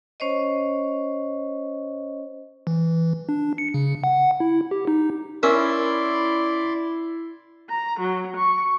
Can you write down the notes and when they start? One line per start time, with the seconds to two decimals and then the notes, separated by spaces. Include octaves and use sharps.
0.20 C#4 C5 C#5 D#5
2.67 E3
3.29 D4
3.58 C#7
3.74 C#3
4.04 F#5
4.40 E4
4.71 G4
4.87 D#4
5.43 C#4 E4 A#4 D5 E5 C6
7.69 A#5
8.00 F#3
8.37 C#6